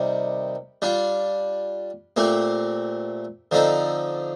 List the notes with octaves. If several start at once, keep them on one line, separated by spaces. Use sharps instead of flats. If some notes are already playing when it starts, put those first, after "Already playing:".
Already playing: C3 D#3 G3
G3 D4 F4
A#2 A3 C4 G4
D3 F3 C4 D#4 A4